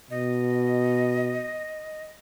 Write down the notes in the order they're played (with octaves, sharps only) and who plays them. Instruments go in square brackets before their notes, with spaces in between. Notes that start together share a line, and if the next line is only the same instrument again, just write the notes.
[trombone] B2 [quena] D#5